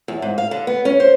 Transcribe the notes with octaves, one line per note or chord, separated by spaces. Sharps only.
E2
G#2
F5
D3
B3
C#4
C5